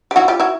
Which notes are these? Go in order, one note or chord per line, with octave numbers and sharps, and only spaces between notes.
G4
E4 F#4
F4 G4
E4 F#4